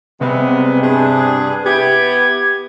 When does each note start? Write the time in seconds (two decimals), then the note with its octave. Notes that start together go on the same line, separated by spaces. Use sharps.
0.21 C3 G3 G#3 B3
0.82 G2 D4 G#4
1.66 B3 E4 G4 G#6